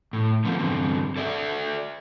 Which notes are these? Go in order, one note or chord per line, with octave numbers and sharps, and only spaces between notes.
A2
D3 F3 B3 C4
G2 D3 C4
A4 D5 E5